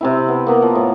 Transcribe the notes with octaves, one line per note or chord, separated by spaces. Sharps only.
C3 C4 E4
B3
A#3 B3 A#4
F3
A2